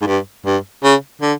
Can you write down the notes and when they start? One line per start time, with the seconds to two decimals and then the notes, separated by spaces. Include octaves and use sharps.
0.01 G#2
0.07 G2
0.45 G2
0.83 C#3
1.21 D3